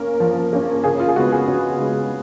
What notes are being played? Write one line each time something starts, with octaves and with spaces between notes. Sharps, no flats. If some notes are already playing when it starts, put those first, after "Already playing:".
Already playing: A#3 C#4 A#4
F3
A#3 C#4
C#3 G#4
F4
G#4
G#3 B3 F#4
G#4
C#3 F#4
G#3 B3